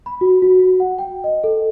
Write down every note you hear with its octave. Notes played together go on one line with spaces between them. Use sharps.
B5
F#4
F#4
F#4
F#5
G5
D#5
A4